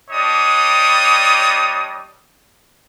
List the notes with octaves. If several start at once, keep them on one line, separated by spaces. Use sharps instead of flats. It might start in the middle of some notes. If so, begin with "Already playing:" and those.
G3 D4 C#5 D#5 D#6